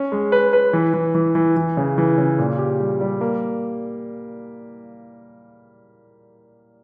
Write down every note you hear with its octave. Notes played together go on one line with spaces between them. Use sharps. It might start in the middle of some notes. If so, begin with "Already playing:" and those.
Already playing: C#4
G#3
B4
B4
E3
E3
E3
E3
E3
C#3
E3
C#3
A#2
G4
G3
G3
A#3